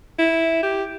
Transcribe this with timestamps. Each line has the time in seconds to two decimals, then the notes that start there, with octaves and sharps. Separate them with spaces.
0.19 E4
0.63 G4